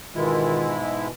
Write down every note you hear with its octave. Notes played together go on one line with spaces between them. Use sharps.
G#2 B2 D#3 E3 G#3 E4 F4